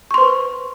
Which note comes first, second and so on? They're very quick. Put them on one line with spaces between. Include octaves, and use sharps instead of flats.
C#6 C6 C5 B4